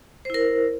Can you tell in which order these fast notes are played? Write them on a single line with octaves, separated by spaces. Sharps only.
C5 E4 A#4